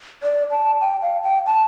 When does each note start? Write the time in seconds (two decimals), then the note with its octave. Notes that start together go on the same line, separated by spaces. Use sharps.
0.23 D5
0.51 A5
0.81 G5
1.02 F5
1.24 G5
1.46 A5